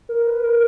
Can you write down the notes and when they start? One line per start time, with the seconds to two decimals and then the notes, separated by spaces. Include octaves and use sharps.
0.09 A#4
0.27 B4
0.44 A#4